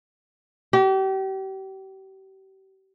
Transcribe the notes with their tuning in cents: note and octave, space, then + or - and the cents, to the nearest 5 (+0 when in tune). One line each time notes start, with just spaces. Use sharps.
G4 -35